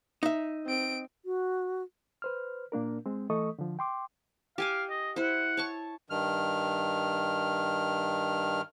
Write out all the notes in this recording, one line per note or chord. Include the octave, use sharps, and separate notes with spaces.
D#4 E5
C4 D7
F#4
B4 C5 F6
A#2 A#3 D4 A#4
G#3 C4
E3 A3 A4 D#5 C#6 D#6
D3 F3
G5 C6 D6
G4 F5 G#5 D6
D#5
E4 C5 F#5
C#5 A5 C#6
G2 D#3 F6